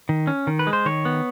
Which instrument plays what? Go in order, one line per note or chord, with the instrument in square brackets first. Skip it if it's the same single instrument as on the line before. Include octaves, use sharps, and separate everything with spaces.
[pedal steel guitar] D#3
C#4
D#3
B4
G#3
C5
D#3 C#5
B3